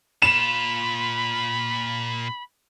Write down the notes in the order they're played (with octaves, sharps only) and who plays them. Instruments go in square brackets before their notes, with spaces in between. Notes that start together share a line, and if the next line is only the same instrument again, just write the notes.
[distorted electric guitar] A#2 F4 [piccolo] B5 [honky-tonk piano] E7